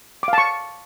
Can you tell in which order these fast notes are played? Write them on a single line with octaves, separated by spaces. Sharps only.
D6 F5 A5 C#6